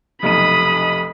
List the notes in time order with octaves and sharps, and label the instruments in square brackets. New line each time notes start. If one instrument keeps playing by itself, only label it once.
[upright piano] F1 B1 D#7 [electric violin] B5 D#6